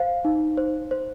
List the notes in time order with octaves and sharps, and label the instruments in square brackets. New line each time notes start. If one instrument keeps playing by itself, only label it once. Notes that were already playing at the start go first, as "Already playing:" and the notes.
Already playing: [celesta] C5 F5
D#4
C5
C5